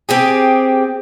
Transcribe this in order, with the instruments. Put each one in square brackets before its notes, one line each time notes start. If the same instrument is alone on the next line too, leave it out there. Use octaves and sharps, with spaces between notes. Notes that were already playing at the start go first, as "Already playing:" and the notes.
[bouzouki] C4 G4 G#4